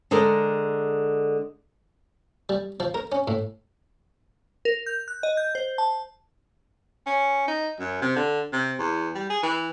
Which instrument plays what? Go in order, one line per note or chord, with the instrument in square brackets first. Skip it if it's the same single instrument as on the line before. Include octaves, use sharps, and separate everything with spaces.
[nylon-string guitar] D3 G#3 A4 A#4
[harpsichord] G3
F3
A#4
C#4
A2
[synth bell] A#4
G6
F#6
D#5
G6
C5
A5
[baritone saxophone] C#4
D#4
F#2
C3
D3
C3
E2
G3
G#4
E3